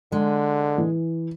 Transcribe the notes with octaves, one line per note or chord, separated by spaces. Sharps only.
D3 G#3
E3